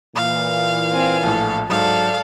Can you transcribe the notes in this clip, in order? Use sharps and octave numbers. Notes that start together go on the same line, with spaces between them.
A#2 E3 F5
C4 G#5
A#1 A2 A4
G#2 F#3 A4 D5 F5